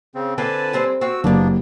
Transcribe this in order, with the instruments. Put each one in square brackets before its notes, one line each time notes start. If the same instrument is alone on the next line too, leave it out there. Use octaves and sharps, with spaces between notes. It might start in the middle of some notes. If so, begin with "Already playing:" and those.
[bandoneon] C#3 C4
[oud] D3 C4 F4 [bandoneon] B4 G#5 A5
[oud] G3 C4 C5
[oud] C4 [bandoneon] F#4 E6
[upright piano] F#1 [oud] G2 G3 [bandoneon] A#3 B3 D4